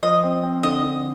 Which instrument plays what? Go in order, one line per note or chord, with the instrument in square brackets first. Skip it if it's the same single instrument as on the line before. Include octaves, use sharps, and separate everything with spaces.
[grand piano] F3 [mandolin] D#5
[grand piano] C4
C4
[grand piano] D3 [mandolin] D#5
[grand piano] D3